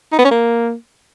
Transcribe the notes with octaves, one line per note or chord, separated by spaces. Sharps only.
D#4
B3
C#4
A#3